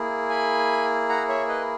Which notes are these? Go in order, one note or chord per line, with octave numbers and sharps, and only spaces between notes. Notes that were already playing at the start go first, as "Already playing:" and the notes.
Already playing: A#3 E4 G#4
G#5 B5
F#5 A#5
C#5 E5
B4 D#5